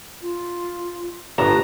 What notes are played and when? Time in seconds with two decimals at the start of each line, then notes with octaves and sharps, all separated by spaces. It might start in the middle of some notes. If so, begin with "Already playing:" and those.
0.22 F4
1.38 G1 A2 D4 B4 A5 A#5